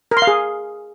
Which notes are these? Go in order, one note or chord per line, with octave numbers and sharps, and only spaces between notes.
A#4
C6
F5
G#4